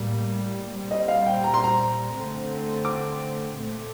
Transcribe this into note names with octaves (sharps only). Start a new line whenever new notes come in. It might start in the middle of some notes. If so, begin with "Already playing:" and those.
Already playing: A2 G3 A#3
A#2 G3 C4
D#5
F5
G5
A#5
C6
A#5
D3 A3 C4
D6
A#2 A3 C4